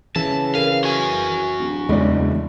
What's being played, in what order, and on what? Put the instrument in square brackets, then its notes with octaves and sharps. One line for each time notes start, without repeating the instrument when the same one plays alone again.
[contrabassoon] C#3 [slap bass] E3 [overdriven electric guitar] A5
[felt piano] A#4 D#7 [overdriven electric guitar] F5
[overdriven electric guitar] F#4 G#5
[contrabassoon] D1
[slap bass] E2 C#3 [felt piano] G#3 E4 D5